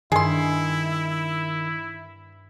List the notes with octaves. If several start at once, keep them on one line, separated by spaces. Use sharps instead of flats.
G2 D#3 E4 G#4 C6